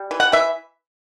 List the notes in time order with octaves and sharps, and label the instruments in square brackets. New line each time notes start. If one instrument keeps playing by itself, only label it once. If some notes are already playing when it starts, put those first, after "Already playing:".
Already playing: [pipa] G3
E3
F#5
E3 E5